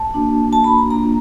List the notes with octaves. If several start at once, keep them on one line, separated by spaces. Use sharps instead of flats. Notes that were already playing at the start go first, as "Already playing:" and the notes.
Already playing: A5
A#3 D4 F#4
A#3 D4 F#4 A5
B5
A#5
A#3 D4 F4 A#5